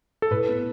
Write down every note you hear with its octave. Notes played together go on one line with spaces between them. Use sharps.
A4
A2 B4
B3